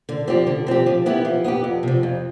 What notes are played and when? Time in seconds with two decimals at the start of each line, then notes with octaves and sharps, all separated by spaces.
0.09 D3
0.28 F3 C4 G4
0.47 D3
0.67 F3 C4 G4
0.86 F3
1.06 B3 E4 G4
1.25 F3
1.44 B3 E4 G4
1.64 F2
1.83 C3 F3
2.03 F2